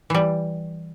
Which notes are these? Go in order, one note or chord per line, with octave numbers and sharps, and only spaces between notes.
E3 G3